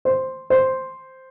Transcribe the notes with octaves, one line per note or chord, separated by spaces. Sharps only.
C5
C5